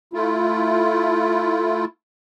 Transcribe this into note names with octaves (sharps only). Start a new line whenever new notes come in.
A3 E4 F4